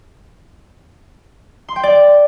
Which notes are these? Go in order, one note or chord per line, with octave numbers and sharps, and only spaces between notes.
C6
G5
D5